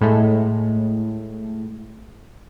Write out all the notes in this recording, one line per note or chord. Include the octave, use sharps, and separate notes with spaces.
A2 G#3 A3